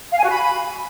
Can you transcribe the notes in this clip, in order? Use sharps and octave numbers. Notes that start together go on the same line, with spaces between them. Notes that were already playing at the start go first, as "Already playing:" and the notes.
F5
G#5
F#4
B5